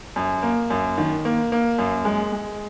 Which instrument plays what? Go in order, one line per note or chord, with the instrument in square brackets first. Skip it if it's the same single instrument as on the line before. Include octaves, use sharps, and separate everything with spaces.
[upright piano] F#2
A#3
F#2
D#3
A#3
A#3
F#2
G#3
G#3